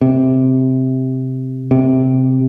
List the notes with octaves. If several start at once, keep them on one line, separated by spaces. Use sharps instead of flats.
C3
C3